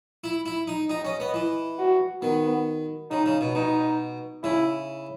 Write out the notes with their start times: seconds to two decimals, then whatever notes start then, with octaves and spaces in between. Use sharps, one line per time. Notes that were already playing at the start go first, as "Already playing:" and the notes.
0.24 E4
0.46 E4
0.68 D#4
0.90 D#4 D#5
1.05 C#4
1.20 B3
1.34 E3
1.78 F#4
2.22 D#3 B3
3.11 C#3 D#4
3.26 C#3
3.41 B2
3.55 B2 D#4
4.43 C#3 E4